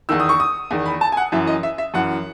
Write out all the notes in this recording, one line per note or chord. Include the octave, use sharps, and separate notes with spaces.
E2 D#3 E6
D#6
C#6
D#6
E2 D#3
B5
A5
G#5
F#5
F#2 E3 E5
D#5
E5
E5
F#2 E3 F#5